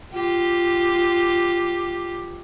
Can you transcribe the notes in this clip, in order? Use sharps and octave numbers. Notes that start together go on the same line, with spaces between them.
F4 G4